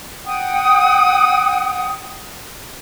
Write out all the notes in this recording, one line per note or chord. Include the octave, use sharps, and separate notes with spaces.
F#5 G5 D#6